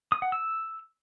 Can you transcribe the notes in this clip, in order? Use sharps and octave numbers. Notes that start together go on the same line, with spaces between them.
D#6
F#5
E6